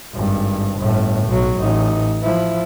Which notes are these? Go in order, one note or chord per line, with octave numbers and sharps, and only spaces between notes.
G#1 G2
G1 A2
B1 F#3
A1 D#4
F3 E4